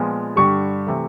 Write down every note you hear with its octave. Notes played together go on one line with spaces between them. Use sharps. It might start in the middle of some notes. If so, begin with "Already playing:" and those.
Already playing: A#2 F3 G#3 B3
G2 D3 G3 C#6
C3 E3 A3